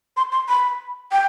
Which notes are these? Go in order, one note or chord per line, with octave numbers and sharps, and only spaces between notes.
C6
C6
B5
G5